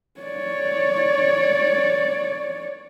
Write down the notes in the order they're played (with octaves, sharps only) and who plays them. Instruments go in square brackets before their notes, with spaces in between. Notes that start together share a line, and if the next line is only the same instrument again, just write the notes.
[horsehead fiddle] C#5 D5